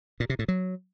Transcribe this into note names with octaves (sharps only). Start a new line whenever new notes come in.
A#2
C3
A2
F#3